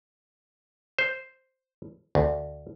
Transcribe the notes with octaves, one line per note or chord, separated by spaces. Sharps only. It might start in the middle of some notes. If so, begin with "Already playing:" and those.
C5
D2